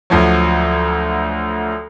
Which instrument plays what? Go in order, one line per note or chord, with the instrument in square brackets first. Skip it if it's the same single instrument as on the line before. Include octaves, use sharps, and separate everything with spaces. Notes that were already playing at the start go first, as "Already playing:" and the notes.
[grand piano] D2 F3 F#3